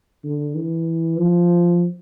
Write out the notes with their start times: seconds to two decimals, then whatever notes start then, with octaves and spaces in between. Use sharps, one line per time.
0.24 D3
0.55 E3
1.18 F3